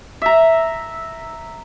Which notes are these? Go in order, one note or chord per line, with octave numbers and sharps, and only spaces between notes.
E5 A#5